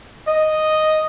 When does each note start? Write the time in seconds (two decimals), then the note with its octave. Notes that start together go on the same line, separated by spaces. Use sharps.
0.28 D#5